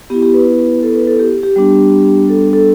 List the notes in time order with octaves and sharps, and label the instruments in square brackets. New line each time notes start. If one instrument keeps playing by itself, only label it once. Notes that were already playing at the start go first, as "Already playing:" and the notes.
[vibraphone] B3 E4 G4
G4
B4
A4
B4
A4
G4
G4
G3 B3 D4
A4
A4